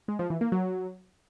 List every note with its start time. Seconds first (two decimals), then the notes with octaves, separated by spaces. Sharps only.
0.08 G#3
0.19 F3
0.30 E3
0.41 A#3
0.52 F#3